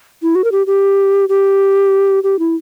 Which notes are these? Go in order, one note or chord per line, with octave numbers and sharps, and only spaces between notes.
E4
F#4
A#4
G4
G4
G4
G4
E4